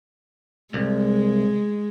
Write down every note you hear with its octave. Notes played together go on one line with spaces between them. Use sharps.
C2 G#3